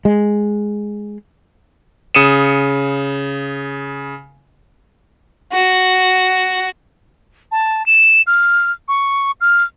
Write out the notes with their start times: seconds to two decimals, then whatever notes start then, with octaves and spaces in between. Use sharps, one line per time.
0.05 G#3
2.15 C#3 D#6 C#7 D#7 E7
5.53 F#4
7.52 A5
7.86 E7
8.27 F6
8.88 C#6
9.41 F6